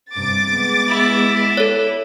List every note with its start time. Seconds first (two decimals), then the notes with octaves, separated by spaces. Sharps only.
0.15 G2 C3 D6 A6
0.45 G#3 B3
0.89 E4
1.57 A4 C#5